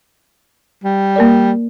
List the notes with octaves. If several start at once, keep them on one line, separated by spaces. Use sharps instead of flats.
G3
A#3 A#4 D5